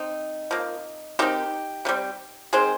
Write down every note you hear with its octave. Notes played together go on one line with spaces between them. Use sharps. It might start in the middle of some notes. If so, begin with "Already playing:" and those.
Already playing: C4 D#4
F3 A#3
D#3 G#3 C4 D#4 G4
C3 D#3 G3 C4
D#3 G#3 C4 G#4 C5